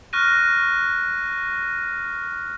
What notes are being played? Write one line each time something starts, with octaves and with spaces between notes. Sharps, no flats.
C#6 F6 F#6 A#6 D#7